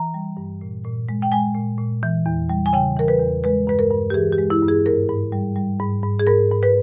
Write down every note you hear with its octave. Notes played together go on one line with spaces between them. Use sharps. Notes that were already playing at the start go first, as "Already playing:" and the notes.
Already playing: E3 A#5
G3
G2
A#2
A#2
G#3
G5
G#3 G#5
A#2
A#2
E3
E2
G3
G#5
C#3 G5
E3 A#4
B4
E2
G#3 B4
G2 B4
A#4
G2
G4
E3 G#4
G4
G#3
E4
G2
G#4
G#2 A#4
G#2
G3
G3
G#2
G#2
G#4
G#2 A#4
G#2
B4